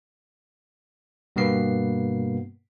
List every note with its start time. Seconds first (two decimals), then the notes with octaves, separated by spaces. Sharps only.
1.36 G2 B2 A#3 B3 C7